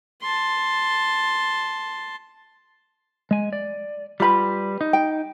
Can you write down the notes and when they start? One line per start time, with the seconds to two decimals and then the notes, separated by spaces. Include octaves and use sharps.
0.22 A5 C6
3.31 G#3 G#5
3.53 D5
4.20 G3 F4 G4 B4 B5
4.81 D#4
4.93 G5